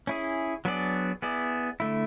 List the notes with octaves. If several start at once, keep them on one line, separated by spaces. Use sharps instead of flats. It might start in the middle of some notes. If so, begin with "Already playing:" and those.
C#4 E4 G#4
F#3 B3 D4 G#4 D5
B3 E4 G#4 D5
D3 A3 E4